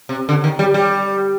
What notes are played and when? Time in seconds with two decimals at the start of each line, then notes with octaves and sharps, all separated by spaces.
0.09 C3
0.29 D3
0.44 D#3
0.59 G3
0.74 G3